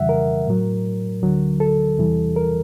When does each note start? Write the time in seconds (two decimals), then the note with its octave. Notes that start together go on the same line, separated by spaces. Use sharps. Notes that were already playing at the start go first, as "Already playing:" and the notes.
Already playing: F2 C#3 E3 G3 E5 F#5
0.09 A#4
0.47 A2 F#3
1.22 D2 D3 F#3
1.60 A4
1.98 E2 C3 E3 G3
2.36 A#4